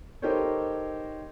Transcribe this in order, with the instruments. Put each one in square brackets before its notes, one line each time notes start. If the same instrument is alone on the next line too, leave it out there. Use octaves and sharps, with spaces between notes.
[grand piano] D#4 G4 A4 A#4 C5 C#5